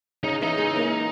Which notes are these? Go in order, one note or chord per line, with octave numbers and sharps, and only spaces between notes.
C#3 C#4 D#4
E3 D#4 E4
G#3 G#4
A#3 A#4